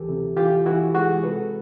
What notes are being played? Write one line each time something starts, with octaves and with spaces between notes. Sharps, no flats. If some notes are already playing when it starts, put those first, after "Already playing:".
Already playing: D2 E3 G4 A4
C3
E3 F4 G4
E3 E4 F#4
G#3 F#4 G#4
C3 A4 B4